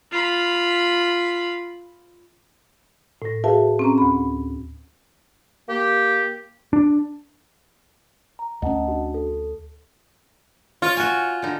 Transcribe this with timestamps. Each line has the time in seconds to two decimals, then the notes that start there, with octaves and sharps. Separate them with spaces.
0.12 F4 B5
3.22 A2 A#6
3.44 F#4 G#4 B4 E5 F5 A5
3.79 C4 C#4 A#5
3.98 D2 B5
5.68 A#3 G4
6.73 D4
8.39 A#5
8.62 D2 C#4 D#5 F#5 A5
8.88 D4 F#4
9.14 A4
10.82 F4 C#5
10.97 F#4 G#5
11.42 D3 D#4